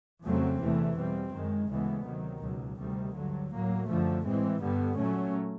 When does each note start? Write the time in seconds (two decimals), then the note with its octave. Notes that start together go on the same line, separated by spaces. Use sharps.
0.23 F2 C#3 F#3 A3 C4
0.59 E2 C3 E3 A3
0.95 E2 B2 G3 C4
1.32 F#2 D#3 G#3
1.68 D2 C#3 E3 G#3 B3
2.05 C3 D#3 F#3
2.42 C#2 B2 F#3
2.78 D2 C3 D#3 G3
3.14 G2 D3 F#3
3.51 A2 F#3 A#3
3.87 F#2 D3 F3 A3
4.23 A2 E3 G#3 C4
4.60 G2 D3 G3 B3
4.97 A#2 F#3 A3 C#4